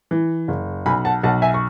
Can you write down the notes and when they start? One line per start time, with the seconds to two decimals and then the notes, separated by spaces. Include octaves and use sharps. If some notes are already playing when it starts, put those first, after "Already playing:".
0.11 E3
0.48 F#1
0.86 B1 G#5 B5
1.05 F#5 A5
1.23 B1 F#5 A5
1.42 E5 G#5
1.54 C#6